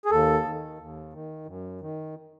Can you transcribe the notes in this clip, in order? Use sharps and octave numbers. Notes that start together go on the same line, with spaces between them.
G#4
D#2 A4
D#3
D#2
D#3
F#2
D#3